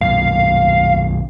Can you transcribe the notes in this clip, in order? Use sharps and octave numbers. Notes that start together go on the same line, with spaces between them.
B1 F#2 A#2 F5